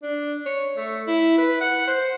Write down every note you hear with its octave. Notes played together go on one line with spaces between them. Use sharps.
D4
C#5
A3
E4
B4
F#5
C5